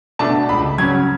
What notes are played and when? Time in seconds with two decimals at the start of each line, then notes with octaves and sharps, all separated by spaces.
0.19 B2 A3 D4 A5
0.49 C#2 B5
0.78 C#3 F#3 C#4 G#6